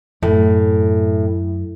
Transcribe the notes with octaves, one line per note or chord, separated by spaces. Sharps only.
F#2 A2